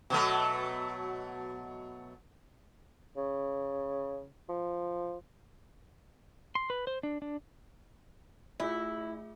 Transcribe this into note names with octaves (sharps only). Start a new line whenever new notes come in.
B2 F#3 A3
C#3
F3
C6
B4
C5
D4
D4
A3 E4 F4 G#4